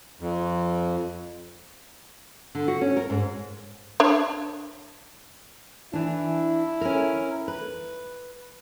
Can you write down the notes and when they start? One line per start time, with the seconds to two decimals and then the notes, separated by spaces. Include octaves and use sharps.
0.20 F2
2.55 D3
2.68 F#4
2.81 C#4
2.97 A#4
3.10 G#2
4.00 D4 C#5 E5
5.93 E3 D4 E4
6.81 C#4 A#4
7.48 B4